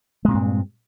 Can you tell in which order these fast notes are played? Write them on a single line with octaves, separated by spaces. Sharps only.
G#3 A#2 C4 G2